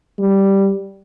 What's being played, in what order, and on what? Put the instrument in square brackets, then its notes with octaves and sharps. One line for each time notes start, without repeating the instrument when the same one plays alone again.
[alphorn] G3